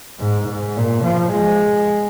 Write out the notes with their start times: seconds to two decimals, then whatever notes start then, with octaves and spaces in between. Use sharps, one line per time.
0.20 G#2
0.48 G#2
0.77 A#2
1.04 F3
1.32 G#3